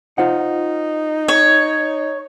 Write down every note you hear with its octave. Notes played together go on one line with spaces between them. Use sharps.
D#4 F4 C5 F#5
C#5